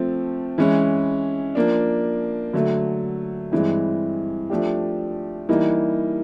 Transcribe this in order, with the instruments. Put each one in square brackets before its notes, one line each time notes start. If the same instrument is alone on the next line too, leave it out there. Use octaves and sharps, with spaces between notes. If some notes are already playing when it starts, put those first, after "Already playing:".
Already playing: [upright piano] F3 A3 C4
E3 G#3 C#4 E4
F3 A#3 D4
D3 F#3 A3
G2 E3 G#3 C4
F3 A3 D4 G4
E3 G3 A#3 D#4